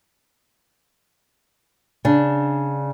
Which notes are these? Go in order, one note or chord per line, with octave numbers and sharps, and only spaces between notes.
C#3 D4